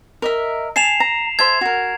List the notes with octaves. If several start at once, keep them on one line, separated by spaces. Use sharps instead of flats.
A#4 D#5 E5
G#5 A5 C7 E7 F7
A#5
C5 E5 A5 G#6
F#4 A#4